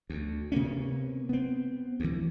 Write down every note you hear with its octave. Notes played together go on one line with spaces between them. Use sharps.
D2
C3 A#3 B3 C#4
B3 C4
D2 E3